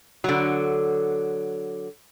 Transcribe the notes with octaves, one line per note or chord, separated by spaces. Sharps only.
D3 F#3